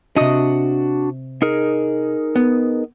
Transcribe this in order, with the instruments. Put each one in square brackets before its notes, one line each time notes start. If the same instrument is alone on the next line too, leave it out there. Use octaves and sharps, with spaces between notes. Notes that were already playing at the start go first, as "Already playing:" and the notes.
[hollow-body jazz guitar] C3 D#5 [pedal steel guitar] D4 F#4 D#6
[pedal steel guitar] D#4 G#4 A#4
[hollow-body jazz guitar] B3